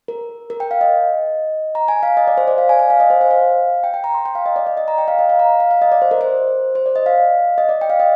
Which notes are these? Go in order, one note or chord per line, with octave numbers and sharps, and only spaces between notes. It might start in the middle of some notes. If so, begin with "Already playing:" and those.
A#4
A#4
G5
F5
D#5
A#5
G#5
F5
D#5
D5
C5
D5
F5
G#5
G#5
F5
D#5
C5
C5
F5
G5
G5
A#5
C6
G5
F5
D#5
D5
D#5
D#5
A#5
G5
F5
D#5
F5
A#5
F5
F5
D#5
D5
C5
A#4
C5
C5
D5
D#5
F5
D#5
D5
G5
F5
D#5